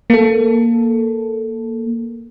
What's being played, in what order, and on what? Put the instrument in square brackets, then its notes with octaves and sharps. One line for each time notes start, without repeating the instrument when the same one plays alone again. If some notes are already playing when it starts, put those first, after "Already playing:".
[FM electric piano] A#3 A4